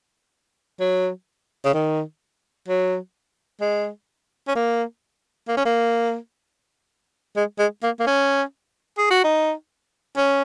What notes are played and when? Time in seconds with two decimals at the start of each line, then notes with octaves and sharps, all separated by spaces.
0.80 F#3
1.65 C#3
1.74 D#3
2.68 F#3
3.61 G#3
4.48 C#4
4.55 A#3
5.48 A#3
5.57 C#4
5.65 A#3
7.37 G#3
7.59 G#3
7.83 A#3
8.00 A#3
8.07 C#4
8.98 G#4
9.10 F#4
9.24 D#4
10.17 C#4